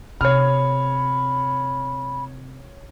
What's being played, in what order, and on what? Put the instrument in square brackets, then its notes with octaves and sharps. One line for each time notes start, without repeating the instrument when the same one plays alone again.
[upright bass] C3 [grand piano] C#5 F6 [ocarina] B5